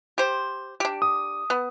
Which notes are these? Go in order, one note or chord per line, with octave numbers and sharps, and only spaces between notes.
G4 C5
D4 G4
D#6
B3